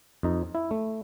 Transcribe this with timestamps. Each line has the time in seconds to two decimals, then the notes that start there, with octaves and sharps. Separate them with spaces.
0.23 F2 D#4
0.55 E4
0.71 A3